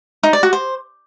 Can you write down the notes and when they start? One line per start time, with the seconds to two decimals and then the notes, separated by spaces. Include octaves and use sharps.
0.23 D#4
0.33 D5
0.43 F#4
0.53 C5